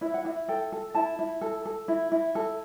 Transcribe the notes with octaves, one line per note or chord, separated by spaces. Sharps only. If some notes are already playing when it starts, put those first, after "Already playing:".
E4 E5
F#5
E4 E5
A4 G5
A4
E4 A5
E4
A4
A4
E4
E4
A4